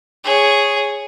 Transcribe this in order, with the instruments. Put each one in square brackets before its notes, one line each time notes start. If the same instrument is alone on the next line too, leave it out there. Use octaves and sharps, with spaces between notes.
[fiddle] G#4 C#5